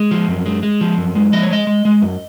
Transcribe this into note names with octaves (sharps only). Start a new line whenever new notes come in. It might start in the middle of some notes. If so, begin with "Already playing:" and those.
Already playing: G#3
F3
F#2
G#3
G#3
F3
F#2
G#3
F3 D#5
C#5
G#3 D#5
G#3
G#3
F#2